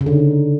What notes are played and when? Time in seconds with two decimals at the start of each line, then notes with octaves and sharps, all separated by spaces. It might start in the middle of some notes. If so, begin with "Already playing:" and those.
0.01 C#3
0.06 D3
0.12 D#4